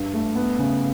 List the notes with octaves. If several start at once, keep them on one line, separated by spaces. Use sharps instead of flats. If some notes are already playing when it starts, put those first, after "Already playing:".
Already playing: G2
A3
B3
C#3